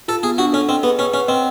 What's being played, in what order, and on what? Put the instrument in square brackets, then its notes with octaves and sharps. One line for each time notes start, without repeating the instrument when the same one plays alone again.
[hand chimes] F4 [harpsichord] A4
[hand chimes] B3 [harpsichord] G#4
[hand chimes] D4 [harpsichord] F#4
[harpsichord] C#4 [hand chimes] A4
[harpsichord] C4 [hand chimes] D#5
[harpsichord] B3 [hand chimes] G#4
[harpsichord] C#4 [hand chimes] B4
[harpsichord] C#4 [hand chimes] F#5
[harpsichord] C4 [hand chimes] D#5